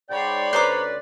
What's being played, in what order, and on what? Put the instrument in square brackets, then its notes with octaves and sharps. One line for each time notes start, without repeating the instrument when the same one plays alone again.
[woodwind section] G#2 G5 [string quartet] C#5 B5 C6 [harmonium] D5
[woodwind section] D2 C#4 B4 [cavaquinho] C5 A#5 D6